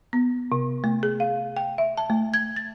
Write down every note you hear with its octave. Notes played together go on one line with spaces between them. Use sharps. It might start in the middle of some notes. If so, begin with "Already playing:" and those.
B3
C3
A3
G#4
F5
G5
E5
A5
A3
G#6
A6